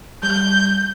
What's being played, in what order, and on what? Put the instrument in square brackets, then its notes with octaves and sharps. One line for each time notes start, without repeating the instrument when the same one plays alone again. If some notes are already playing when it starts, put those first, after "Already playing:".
[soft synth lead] G3 [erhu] G6